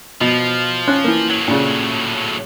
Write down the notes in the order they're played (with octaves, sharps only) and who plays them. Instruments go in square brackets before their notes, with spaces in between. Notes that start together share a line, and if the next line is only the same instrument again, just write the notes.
[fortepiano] B2 [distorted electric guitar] F3
[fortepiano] C#4 F#6
E3 A#3
[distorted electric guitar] A2 F#3
[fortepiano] A#2 C#3